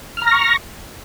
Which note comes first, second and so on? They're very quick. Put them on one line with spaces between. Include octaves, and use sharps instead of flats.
F6 A#5 A#6 C#6